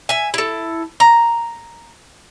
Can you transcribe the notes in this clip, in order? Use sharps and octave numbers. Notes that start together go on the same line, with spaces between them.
E5 G#5
E4 A4
A#5